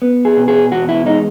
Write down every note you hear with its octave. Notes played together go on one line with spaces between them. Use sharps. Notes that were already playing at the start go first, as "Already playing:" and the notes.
B3
G#4
B2
G#4
E2 F#4
E4
G#3 D#4